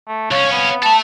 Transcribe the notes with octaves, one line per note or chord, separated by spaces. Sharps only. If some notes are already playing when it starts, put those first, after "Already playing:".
A3
C2 C#4 C#5 F5
B3
A4 E5 A5